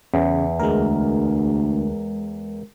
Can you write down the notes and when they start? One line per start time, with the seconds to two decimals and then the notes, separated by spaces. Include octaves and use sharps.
0.14 E2 C#3
0.59 D2 G#3 A#4